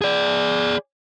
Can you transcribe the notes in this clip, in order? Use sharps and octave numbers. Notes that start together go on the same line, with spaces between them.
G#4 D5